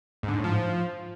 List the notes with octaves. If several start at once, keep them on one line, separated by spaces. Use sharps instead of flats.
G#2
D3
G#2
A2
F3